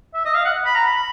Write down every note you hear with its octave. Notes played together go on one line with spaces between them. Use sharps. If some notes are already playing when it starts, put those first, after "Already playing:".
E5
D#5
F5
F#5
B5
A#5
B5